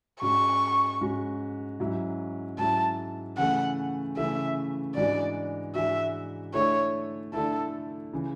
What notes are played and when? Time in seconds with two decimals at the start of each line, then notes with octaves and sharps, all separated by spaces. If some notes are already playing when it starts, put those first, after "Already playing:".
0.21 G#2 G#3 C#4 F#4 C#6
1.01 G#2 G#3 C#4 F#4
1.80 G#2 F#3 C#4 E4
2.58 G#2 F#3 C#4 E4 A5
3.38 C#3 E3 A3 C#4 F#5
4.17 C#3 E3 A3 C#4 E5
4.96 G#2 E3 G#3 D4 F#4 D5
5.75 G#2 E3 G#3 D4 F#4 E5
6.54 D3 A3 E4 C#5
7.33 D3 A3 E4 A4
8.13 C#3 E3